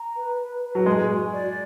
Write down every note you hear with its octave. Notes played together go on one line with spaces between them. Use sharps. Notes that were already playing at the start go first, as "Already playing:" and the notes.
Already playing: A#5
B4
B4
B4
F#3
G#3 G#5
F#4
D5